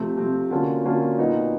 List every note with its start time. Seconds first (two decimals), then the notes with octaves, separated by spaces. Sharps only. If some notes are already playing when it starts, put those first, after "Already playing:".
Already playing: C3 F3 A3 C4
0.18 C3 F3 A3 C4
0.51 D3 F#3 A#3 C#4 F4
0.85 D3 F#3 A#3 C#4 F4
1.18 A#2 F#3 B3 D#4